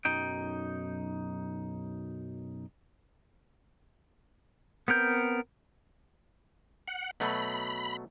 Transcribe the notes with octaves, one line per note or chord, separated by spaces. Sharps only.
B1 F#2 D#4 G5
B3 C4 A#4 G6
F#5
B2 F#3 A3 B5